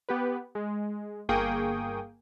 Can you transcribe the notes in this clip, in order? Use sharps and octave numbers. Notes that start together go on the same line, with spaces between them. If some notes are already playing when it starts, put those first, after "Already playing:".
B3 G4 B4
G#3
G1 A#3 G#4 G5 C#6 D#6